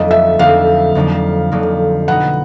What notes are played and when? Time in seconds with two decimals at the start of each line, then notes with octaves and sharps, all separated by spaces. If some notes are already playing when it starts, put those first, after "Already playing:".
Already playing: F2 D3 F#3 A#3 D#4 D#5
0.11 E5
0.39 F2 D3 F#3 A#3 D#4 F5
0.95 F2 D3 F#3 A#3 D#4
1.52 F2 D3 F#3 A#3 D#4
2.08 B2 F#3 B3 D#4 F#5